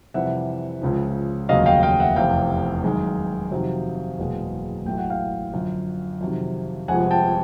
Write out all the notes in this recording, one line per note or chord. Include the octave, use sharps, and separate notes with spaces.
F2 C3 E3 G3 E5 F#5
C#2 C#3 F3
F1 D#2 C#3 F#3 D#5 F5
F5 G5
F5 G5
E5 F#5
F1 E2 C3 F5 G5
F#2 D#3 G#3
F2 C3 D#3 F#3
F#1 E2 B2 G#3
A1 A2 F#3 A3 G5
F#5
F5 G5
F#2 D3 F3
F2 C3 D#3 F#3
G1 F2 C3 F3 G#3 F#5 G#5
G5 A5